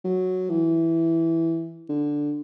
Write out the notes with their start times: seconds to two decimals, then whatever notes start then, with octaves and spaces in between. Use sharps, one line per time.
0.04 F#3
0.49 E3
1.89 D3